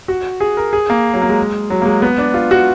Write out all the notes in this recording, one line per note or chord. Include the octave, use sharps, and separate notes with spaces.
F#4
G#4
A#4
G#4
A#3
F#3
A#3
G#3
F#3
A#3
G#3
B3
D4
F4
F#4